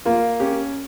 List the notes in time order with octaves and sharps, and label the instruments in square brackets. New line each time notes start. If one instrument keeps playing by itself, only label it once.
[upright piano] A#3 F4
C#4 G4